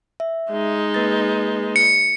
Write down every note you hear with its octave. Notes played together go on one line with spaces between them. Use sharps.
E5
G#3 D#4
A#3 B4 A6
C#7